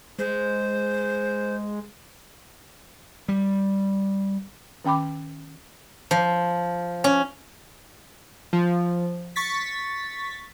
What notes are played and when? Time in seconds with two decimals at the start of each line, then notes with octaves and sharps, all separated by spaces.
0.19 G#3 C5
3.28 G3
4.84 D#3 C#4 G5 B5 D6
6.11 F3
7.04 C#4
8.53 F3
9.36 C#6 A6 B6